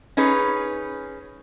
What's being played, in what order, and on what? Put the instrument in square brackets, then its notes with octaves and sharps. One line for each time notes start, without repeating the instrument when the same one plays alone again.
[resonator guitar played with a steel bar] C#4 D#4 G#4 B4